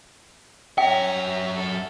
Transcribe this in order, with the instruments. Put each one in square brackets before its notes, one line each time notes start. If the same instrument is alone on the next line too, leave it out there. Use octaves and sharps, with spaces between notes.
[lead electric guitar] F#2 E5 [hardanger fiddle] C#4 A#5 [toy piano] G5
[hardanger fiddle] A4